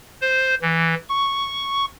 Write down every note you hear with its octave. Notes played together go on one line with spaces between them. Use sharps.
C5
E3
C#6